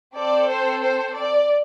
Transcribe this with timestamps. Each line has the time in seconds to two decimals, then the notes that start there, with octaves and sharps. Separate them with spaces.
0.15 C4 A4 D5
0.49 C5
0.82 C5
1.16 D5